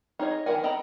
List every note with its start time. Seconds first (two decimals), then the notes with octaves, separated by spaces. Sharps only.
0.19 D#4 G#4 C#5 D#5
0.46 D#3 F#3 A#4 F#5 G#5
0.63 A4 D#5 G5 A#5 B5